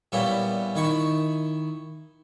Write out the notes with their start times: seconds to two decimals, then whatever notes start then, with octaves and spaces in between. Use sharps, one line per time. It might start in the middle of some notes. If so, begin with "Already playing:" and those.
0.12 A#2 G3 B3 C#4 E4
0.75 D#3 E4 C#6